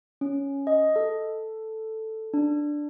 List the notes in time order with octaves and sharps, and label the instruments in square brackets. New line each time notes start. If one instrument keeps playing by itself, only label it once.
[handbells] C#4
D#5
A4
D4